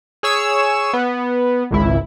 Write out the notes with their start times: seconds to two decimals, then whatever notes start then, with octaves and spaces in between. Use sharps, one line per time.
0.23 G#4 C#5 E6
0.93 B3
1.71 G#1 C#2 E4